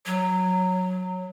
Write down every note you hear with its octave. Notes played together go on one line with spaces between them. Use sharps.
F#3